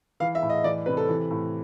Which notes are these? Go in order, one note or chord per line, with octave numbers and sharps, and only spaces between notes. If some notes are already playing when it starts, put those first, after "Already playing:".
E3 F5
E5
A2
D#5
E3 D5
C3 B4
A4
E3
A2